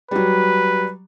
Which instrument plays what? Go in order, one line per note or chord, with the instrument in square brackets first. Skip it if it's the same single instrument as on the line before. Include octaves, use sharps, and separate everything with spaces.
[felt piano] F#3 G3 [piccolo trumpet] B4